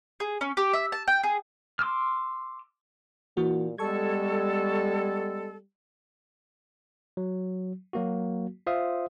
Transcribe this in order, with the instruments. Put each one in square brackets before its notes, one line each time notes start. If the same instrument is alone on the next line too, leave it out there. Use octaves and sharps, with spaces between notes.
[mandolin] G#4
C#4
G4
E5
A5
G5
G#4
[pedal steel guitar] C6 D6 E6 F6
[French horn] A#2 [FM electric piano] E3 A#3 F#4
[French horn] G3 [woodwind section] G#3 B3 A4 [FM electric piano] A5 C#6 G#6
[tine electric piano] F#3
F#3 A#3 F#4
F4 C5 E5 F5 D#6